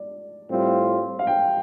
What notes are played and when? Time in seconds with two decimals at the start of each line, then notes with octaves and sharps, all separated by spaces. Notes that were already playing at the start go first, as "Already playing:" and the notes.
Already playing: D5
0.50 A2 G3 C4 F4
1.19 F5
1.27 G5